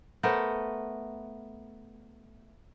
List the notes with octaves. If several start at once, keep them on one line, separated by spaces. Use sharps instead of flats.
A3 B3 A#4 C5